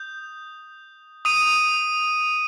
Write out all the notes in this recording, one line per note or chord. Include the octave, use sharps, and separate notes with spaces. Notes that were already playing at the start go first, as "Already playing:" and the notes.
Already playing: D#6 G6
D#6 D#7